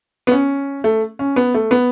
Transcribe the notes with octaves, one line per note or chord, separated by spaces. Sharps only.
B3
C#4
A3
C#4
B3
A3
B3